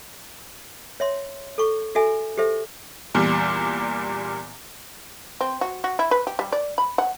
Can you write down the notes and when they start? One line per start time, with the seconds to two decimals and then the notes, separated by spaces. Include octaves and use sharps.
1.00 C#5 E5 C6
1.58 A4 C#6
1.95 F#4 A4 E5 G#5
2.37 G4 A4 C5 E5
3.14 E2 A#2 G3
5.41 C4
5.61 F#4
5.84 F#4
5.99 E4
6.11 B4
6.27 G4
6.39 G3
6.52 D5
6.78 B5
6.98 F#5